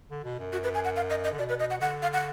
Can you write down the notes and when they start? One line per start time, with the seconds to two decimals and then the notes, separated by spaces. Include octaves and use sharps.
0.11 D3
0.24 B2
0.39 F#2
0.53 F#4
0.64 B4
0.74 G#5
0.85 F#5
0.96 F5
1.10 D#5
1.24 D#5
1.32 D3
1.38 B2 D5
1.49 B4
1.60 D#5
1.70 F#5
1.81 D3 F#5
2.02 F5
2.13 F#5